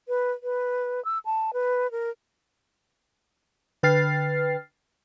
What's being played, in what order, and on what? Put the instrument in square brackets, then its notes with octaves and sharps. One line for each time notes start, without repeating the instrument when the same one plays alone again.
[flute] B4
B4
E6
A5
B4
A#4
[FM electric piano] D3 B4 G5 F6 A6 C7